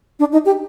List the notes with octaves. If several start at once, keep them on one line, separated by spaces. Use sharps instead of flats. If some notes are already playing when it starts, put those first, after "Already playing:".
D4
D#4
G4